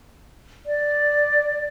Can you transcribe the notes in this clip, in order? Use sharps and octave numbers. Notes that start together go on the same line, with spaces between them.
D5